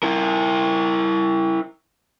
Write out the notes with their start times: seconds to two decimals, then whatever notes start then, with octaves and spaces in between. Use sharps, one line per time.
0.03 E4 A#4